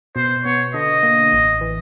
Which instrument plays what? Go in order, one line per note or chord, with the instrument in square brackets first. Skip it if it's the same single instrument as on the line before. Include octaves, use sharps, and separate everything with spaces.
[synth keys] B2 [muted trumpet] C5
[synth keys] B3 [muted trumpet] C#5
[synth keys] D3 [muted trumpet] D#5
[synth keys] A#3
A1
E3